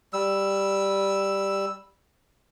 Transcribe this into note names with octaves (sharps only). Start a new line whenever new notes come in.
G3 E6